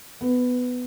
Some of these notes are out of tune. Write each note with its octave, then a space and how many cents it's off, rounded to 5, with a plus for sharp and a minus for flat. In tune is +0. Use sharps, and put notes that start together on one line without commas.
B3 +10